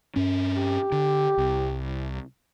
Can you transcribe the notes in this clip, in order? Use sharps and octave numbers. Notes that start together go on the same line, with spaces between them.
G2 C#4
G4
D3
C2